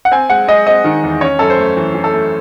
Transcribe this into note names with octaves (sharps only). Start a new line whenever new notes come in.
F#5
C4 G#5
G#3 F#5
G#3 D#5
C4 D#5
D#3
E2
C#4 C#5
F#2 A4
C5
A3
E3
E3
A4
A3